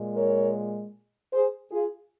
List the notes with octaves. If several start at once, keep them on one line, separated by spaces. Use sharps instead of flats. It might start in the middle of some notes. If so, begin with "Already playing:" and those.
Already playing: A#2 G#3
A#4 C#5
G#4 C5
F4 G#4